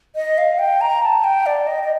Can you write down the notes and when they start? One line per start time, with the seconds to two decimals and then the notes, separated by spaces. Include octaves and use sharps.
0.16 D#5
0.38 F5
0.59 G5
0.81 A#5
1.03 A5
1.24 G5
1.46 D5
1.67 D#5
1.83 D#5